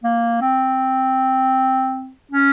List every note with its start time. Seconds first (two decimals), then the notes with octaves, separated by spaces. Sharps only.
0.04 A#3
0.41 C4
2.32 C#4